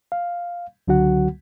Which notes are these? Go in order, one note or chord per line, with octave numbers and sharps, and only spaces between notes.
F5
C#2 D3 F#3 F#4 F#5